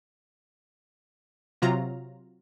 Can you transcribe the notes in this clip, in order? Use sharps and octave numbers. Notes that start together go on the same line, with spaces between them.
C3 F#3 F4 A#5